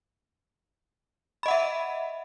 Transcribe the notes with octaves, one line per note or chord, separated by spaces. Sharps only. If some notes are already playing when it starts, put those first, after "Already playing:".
D#5 E5 F#5 B5